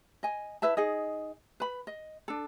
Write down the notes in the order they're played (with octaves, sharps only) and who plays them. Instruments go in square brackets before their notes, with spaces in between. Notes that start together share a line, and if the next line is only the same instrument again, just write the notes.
[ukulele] D#5 G#5
E4 B4 E5 A5
D#4 G#4 D#5
B4 B5
D#5
D4 A4